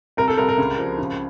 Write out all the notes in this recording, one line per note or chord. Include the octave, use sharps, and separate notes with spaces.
C2 A#4
A4
C2 A#4
A#4
C#2
F3
C#3